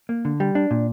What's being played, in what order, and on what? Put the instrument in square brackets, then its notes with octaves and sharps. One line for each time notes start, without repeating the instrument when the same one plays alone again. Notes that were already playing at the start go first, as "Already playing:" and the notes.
[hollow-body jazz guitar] A#3
D3
G3
D4
A#2